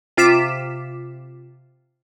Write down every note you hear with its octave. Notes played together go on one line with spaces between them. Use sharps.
C3 F4 D6 B6 E7